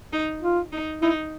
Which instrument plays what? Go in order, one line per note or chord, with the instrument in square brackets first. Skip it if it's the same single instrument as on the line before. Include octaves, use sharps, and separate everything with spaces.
[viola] D#4
[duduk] F4
[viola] D#4
[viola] D#4 [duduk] E4